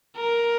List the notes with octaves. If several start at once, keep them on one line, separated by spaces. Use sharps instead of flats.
A#4